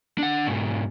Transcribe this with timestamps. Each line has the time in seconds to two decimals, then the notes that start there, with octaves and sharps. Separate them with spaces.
0.18 D4 F#5
0.47 G#2 B2